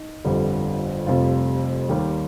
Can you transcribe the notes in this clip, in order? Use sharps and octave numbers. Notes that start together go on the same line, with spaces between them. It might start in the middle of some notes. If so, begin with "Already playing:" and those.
Already playing: D#4
G1 F2 D3 G3
F1 F2 C3 G3 F4
D#2 D#3 G3 G4